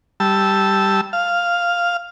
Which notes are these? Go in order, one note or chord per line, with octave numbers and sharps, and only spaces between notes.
G3 A5 E6
F5